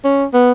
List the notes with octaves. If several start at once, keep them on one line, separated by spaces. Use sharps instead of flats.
C#4
B3